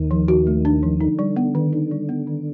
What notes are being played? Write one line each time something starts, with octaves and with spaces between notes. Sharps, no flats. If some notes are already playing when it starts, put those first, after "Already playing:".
Already playing: D#2 D#3
F3
F#4
A3
D4
F3
D3 D#4
G3
B3
D#3
D#4
G3
B3
D#3